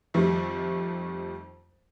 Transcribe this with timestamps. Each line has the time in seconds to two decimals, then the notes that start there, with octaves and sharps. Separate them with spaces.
0.14 F2 D#3 G3 A3